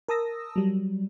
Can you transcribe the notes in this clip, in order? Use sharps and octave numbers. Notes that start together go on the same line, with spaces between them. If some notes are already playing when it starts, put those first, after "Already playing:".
A#4 A5 D#6 E6 A#6
F#3 G3